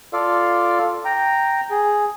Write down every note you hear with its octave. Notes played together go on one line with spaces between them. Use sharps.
F4 A4 D5 F5
G5 A#5
G#4